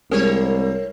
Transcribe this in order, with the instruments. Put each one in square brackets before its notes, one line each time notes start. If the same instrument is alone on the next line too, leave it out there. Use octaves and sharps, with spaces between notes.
[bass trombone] C2 [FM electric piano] G3 G#3 [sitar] C4 C#5 [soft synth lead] A#4